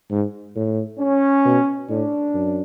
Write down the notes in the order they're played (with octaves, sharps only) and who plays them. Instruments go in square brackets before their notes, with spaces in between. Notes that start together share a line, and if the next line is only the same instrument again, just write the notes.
[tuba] G#2
A2
[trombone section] C#4
[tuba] B2
[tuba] A2 [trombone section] D4
[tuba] F#2